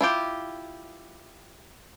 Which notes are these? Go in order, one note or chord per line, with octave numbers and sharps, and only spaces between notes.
E4 F4 G4